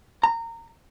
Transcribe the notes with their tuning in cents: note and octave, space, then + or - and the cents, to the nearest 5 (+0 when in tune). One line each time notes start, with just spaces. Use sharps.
A#5 -20